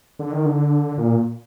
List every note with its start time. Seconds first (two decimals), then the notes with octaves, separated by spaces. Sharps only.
0.19 D3
0.32 D#3
0.46 D3
0.98 A#2